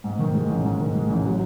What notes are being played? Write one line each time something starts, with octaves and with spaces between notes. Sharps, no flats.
G#2
D#3
G#3
A1
G#2
D#3
G#3
A1
F#3